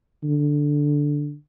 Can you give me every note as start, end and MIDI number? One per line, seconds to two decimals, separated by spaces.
0.23 1.35 50